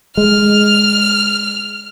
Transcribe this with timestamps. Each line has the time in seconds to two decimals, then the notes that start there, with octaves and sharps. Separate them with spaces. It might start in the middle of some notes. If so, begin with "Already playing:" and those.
0.17 G#3 F6